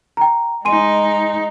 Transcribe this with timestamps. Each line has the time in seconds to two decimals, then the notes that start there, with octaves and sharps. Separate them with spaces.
0.17 G5 A#5
0.65 G#3 D#4 G#5 C6 D#7